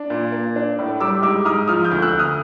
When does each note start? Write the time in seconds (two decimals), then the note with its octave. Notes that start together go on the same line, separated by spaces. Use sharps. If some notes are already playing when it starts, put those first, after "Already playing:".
Already playing: D4
0.10 A#2
0.32 A#3
0.56 D4
0.79 A2
1.00 G3 D6 E6
1.23 G#2 D6 E6
1.45 G#2 D#6 F6
1.68 F3 D#6 F6
1.85 F6 G6
1.91 D2
2.02 E6 F#6
2.13 D2
2.19 D#6 F6